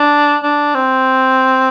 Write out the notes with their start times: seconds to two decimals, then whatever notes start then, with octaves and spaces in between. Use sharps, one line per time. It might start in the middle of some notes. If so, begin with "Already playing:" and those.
Already playing: D4
0.43 D4
0.75 C4